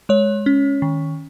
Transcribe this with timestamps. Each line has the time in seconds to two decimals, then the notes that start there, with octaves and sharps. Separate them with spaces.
0.09 G#3 C#5
0.46 C#4
0.82 D#3